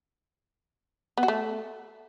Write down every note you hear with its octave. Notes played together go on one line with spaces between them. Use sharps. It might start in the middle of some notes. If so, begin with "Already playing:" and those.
B3
F#4
A3